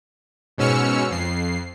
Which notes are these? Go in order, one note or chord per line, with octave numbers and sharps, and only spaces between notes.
G#2 B2 C#4 E6 F6 C#7
F2 C7